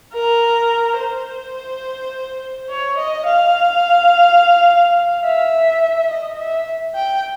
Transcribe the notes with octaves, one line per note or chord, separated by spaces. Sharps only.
A#4
C5
C#5
D#5
F5
E5
D#5
E5
G5